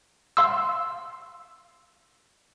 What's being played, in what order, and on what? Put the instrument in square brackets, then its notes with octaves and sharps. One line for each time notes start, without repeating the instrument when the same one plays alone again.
[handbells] F5 C6 E6